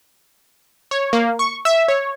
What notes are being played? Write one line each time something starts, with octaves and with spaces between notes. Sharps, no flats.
C#5
A#3
C#6
E5
C#5